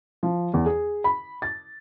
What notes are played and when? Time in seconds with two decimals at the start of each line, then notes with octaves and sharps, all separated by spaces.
0.23 F3
0.54 E2
0.66 G#4
1.04 B5
1.42 A6